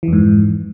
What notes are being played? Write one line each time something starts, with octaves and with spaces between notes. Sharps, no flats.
F2 G#2 E3